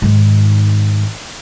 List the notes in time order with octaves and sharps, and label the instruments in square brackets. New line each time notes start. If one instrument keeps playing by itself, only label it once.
[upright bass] G#2 D#3